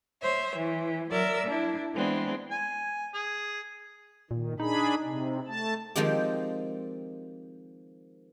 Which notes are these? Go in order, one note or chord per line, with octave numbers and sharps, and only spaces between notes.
C5 C#5 E5
E3
F#3 A#4 D5 E5 E6
D4 E4
E3 G#3 B3 C4 D4
G#5
G#4
A#2 D#3
D4 D#4 G#4 B5
C3
A3 A5
D#3 F3 G#3 C4 G4